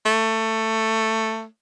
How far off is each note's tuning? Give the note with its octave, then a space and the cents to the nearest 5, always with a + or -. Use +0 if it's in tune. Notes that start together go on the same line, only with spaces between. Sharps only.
A3 +15